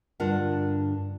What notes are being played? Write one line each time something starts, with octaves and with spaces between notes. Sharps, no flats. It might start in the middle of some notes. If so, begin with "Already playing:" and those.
G2 D3 D4 F4 A#4 F#5